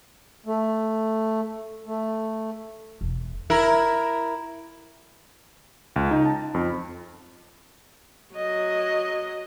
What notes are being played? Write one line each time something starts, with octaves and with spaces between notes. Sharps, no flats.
A3
A3
E1
E4 A#4
C#2
D#4
A5
F2
F#3 D#5